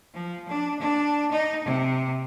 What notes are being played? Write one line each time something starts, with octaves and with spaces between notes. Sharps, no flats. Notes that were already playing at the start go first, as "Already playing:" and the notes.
F3
D4
D4
D#4
C3